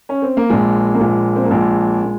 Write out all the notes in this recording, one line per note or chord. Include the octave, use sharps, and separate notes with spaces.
C#4
C4
A#3
A#1 A#2 F3 G#3
A#3
A#1 A#2 F3 G#3
C4
A#3
A#1 A#2 F3 G#3
A#2